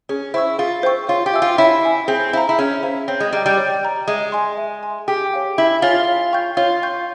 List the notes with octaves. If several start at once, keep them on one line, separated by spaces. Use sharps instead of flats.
C#4 G#4
E4 C5 G5 C#6 E6
F4 G#4
C5 G5 C#6 E6
F4 C#5
G4
E5 G#5 E6
F4
E4 C#5
E5 G#5 E6
C4 G#4
E4 C5 F5 A#5
E4
C#4 G#4
E4 C5 F5 A#5
C4 C#5
G#3
G3 G5 A#5
G3
C#5
G5 A#5
G#3 E5
G#5 C6
E5
G#5 C6
G4 G#4
C#5 F5 G#5
E4 G#4
F4 C#5 F5 G#5
C#5
G5 C#6 G6
F4 C#5
G5 C#6 G6